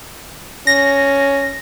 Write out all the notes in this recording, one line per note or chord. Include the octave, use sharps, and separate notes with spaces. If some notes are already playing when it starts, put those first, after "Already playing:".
C#4 A#6